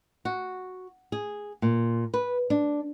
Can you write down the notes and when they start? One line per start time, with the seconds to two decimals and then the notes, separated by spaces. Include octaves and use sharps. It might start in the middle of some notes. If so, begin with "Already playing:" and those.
0.25 F#4
1.12 G#4
1.62 A#2
2.14 B4
2.50 D4